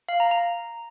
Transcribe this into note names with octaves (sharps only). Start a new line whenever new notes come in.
F5
A#5
A#5